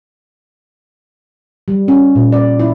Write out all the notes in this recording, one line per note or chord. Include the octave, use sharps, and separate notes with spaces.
G3
C#4
A#2
D5
E4